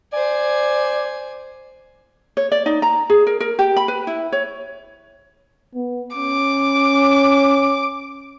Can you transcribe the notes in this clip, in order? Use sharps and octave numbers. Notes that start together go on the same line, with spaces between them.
C5 D5 G#5
C#5
D5
D#4
A#5
G#4
A#4
A#4
G4
B5
B4
E4
C#5
B3
C#4 D6